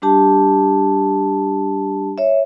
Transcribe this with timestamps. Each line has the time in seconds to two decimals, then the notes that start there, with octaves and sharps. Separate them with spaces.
0.02 G3 D4 G4 A5
2.18 C#5 E5